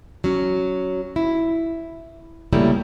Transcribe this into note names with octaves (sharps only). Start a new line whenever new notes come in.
F#3 C#4
E4
C#3 F#3 G3 A3 A#3 E4